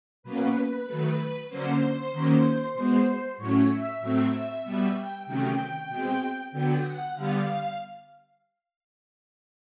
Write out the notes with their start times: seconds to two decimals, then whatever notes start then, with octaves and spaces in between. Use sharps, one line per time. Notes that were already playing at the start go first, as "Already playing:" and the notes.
0.23 B2 F#3 A#3 C#4 B4
0.86 D#3 F#3 A3
1.48 D3 F#3 A#3 C#4 C5
2.11 D#3 F#3 A#3 C#4
2.74 B2 G#3 B3
3.37 A2 F#3 A3 C#4 C#5
3.70 E5
4.00 A2 F#3 A3 C4
4.64 B2 G3 B3 E5
4.95 G5
5.26 C3 D#3 F#3 A3 C#4
5.89 B2 G#3 C4
6.52 D3 F#3 B3 G5
6.83 F#5
7.14 D3 G3 B3 F5